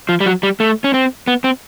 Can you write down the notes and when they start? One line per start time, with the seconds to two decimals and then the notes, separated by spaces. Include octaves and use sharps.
0.09 F3
0.20 G3
0.26 F#3
0.43 G3
0.60 A3
0.84 C#4
0.94 C4
1.28 B3
1.44 C4